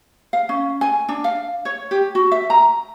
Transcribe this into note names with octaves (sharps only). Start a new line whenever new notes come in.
F5
C#4
G#5
D4
F5
C#5
G4
F#4
E5
A#5